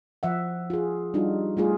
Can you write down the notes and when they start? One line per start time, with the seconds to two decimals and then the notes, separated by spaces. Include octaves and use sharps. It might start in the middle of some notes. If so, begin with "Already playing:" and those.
0.23 F3 E5 F#5
0.70 F4 G#4
1.14 G3 D4 D#4 F4 F#4
1.57 G3 A3 F4 G#4